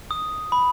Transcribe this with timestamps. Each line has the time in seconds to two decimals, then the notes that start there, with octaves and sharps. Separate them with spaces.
0.11 D#6
0.52 B5